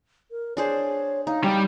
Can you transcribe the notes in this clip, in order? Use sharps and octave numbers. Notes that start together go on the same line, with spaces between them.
A#4
D4 G#4 C5 C#5
D#4 F5
G3 G5